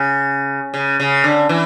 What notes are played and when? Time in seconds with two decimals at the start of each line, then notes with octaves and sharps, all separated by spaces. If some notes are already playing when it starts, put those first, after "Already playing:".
Already playing: C#3
0.74 C#3
1.00 C#3
1.24 D3
1.49 E3